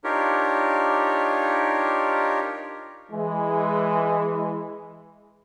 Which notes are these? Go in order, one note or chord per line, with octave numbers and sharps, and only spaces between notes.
D4 D#4 F4 G4 A#4 C#5
E3 G#3